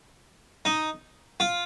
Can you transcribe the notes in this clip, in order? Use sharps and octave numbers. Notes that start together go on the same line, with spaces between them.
D#4
F4